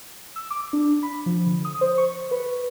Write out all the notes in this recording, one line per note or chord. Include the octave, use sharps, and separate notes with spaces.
E6
D6
D4
B5
F3
D3
D#6
C5
C#6
B4